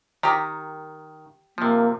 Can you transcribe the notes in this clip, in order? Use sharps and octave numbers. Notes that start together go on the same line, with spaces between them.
D#3 G4 A#5
C3 F3 A#3